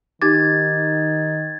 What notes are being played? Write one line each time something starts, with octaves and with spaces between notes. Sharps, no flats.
D#3 D#4 G4 D6 G#6 A6